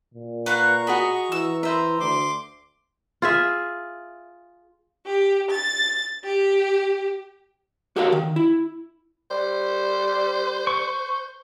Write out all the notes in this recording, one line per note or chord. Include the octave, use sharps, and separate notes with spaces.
A#2
B4 F5 F#5 A#5 C#6
F#4 G#4 D#5 B5
E3 E6
B4 C5 E5 A#5
D2 C6 D6
F4 G#4 E5
G4
A6
G4
F#4 G4 A4 A#4 C#5 F5
D#3
E4
G3 C5
C#6